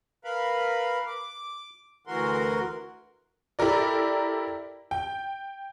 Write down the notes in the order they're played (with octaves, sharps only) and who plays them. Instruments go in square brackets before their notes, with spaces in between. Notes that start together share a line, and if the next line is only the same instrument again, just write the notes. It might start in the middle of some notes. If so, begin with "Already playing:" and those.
[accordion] A#4 B4 F5 B5
D6
D2 E3 F#4 A#4 C6
[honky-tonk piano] E4 G4 A4 A#4 D5
G5